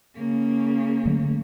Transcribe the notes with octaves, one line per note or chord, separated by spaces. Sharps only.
C#3 A#3
D3 F#3 A3